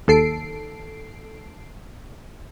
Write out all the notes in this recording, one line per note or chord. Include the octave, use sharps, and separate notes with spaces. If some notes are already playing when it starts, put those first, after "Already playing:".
D#2 A4 C7 D7